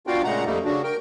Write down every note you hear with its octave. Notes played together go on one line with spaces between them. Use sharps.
B3 D4 F4 F#4 F5 G5
A#2 C#3 G#3 A3 F#5 A#5
F2 G3 A3 A#3 D#4
C#3 D4 F#4
A#4 G5